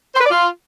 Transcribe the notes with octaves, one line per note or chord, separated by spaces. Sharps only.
C5
B4
D5
F4